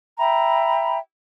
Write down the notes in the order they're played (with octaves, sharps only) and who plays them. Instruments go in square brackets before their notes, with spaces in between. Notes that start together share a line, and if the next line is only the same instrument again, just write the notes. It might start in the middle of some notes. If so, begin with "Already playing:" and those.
[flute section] E5 G5 A#5 B5